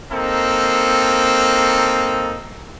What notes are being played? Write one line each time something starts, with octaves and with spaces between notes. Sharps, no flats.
A#3 C4 D#4 A4